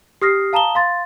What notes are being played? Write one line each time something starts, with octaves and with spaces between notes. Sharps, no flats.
G4 D#6 F6 A#6 C7
F5 A5 A#5 D#6 E7 G7
F5 C6 A6